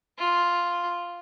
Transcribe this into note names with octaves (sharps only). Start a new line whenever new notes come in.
F4